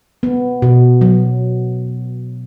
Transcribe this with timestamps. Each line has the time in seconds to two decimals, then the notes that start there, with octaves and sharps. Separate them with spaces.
0.23 B3
0.62 B2
1.01 F#3